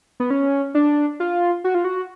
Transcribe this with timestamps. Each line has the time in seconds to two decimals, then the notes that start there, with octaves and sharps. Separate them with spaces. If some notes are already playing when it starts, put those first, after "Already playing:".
0.20 B3
0.30 C#4
0.75 D4
1.20 F4
1.64 F#4
1.75 F4
1.84 F#4